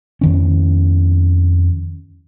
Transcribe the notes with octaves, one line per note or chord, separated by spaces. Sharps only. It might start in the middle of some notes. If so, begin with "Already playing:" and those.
F2 D#3 C#4